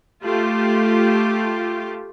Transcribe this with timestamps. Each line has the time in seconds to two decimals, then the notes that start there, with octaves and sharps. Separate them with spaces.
0.24 A3 F4 G4